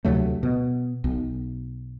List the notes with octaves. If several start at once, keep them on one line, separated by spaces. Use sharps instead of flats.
D2 C3 F#3 A3
B2
B1